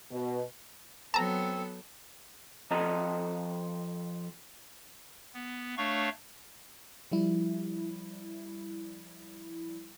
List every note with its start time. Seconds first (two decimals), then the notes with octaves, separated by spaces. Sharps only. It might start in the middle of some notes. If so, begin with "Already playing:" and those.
0.12 B2
1.14 F#3 B3 C4 A4 A5 A#5
2.71 F2 F3 A4 D#5 A#5
5.34 B3
5.77 A3 D4 C#5 F5 C#6
7.11 F3 G3 E4